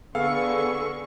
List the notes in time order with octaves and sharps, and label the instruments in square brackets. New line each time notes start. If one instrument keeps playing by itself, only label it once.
[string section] D3 C#6 [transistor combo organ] B3 G#4 [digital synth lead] A4 [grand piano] F5